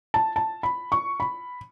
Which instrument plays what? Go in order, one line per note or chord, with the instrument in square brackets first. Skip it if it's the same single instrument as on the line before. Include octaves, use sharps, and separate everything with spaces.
[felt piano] A5
A5
B5
C#6
B5